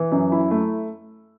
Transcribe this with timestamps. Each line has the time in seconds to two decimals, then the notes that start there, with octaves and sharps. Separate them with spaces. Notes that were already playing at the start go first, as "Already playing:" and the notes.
Already playing: E3
0.12 F#2
0.32 E4
0.51 A3